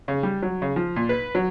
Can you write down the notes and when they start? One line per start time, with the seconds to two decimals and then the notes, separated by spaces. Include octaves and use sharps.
0.08 C#3
0.23 G3
0.42 F#3
0.62 C#3
0.76 F3
0.96 A#2
1.09 B4
1.35 F#3